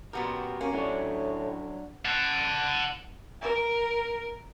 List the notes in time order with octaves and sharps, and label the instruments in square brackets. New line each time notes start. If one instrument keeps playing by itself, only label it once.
[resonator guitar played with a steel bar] A#2 B3 G4 [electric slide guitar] F#4 A#4
[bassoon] A#3 [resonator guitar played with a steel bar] C#4
[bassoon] A2 [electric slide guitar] F#3 D4 C#5
[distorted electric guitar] F#5 A5
[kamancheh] A#4